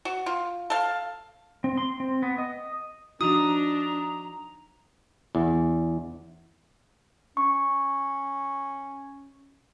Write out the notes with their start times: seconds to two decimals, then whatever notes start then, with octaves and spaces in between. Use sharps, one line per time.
0.05 F#4
0.26 F4
0.70 A4 F5
1.64 C4
1.78 C6
2.00 C4
2.22 B3
2.38 D#5
3.21 F3 D4 D#4 F#4 A#5 D#6
5.35 E2
7.37 C#4 C#6